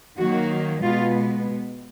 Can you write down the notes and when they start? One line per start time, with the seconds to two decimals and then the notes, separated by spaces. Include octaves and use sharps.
0.18 D#3 F#3 A#3 F#4
0.83 B2 G#3 B3 F4